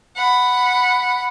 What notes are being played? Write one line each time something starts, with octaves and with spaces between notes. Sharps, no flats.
F#5 B5